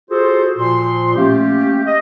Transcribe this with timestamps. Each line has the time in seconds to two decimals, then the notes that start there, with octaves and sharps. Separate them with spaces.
0.10 F4 F#4 G#4 A4 C5
0.57 A#2 F3 C6
1.16 A3 A#3 C#4 G4
1.87 D#5